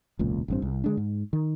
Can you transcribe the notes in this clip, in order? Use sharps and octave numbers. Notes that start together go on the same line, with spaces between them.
E1 C#2 A#2
A1 G2 C4
C2
D3 G#3 D4
G#2
D#3